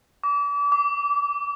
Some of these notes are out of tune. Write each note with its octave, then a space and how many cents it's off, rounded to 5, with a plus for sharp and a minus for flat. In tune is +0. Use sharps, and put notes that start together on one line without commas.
D6 -35
D6 -10